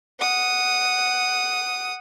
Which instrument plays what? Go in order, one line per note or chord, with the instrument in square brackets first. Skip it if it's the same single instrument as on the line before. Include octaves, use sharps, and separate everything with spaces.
[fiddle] F#5 D#6